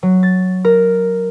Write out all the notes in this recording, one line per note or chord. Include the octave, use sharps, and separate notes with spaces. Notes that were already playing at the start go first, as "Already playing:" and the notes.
F#3
A6
A#4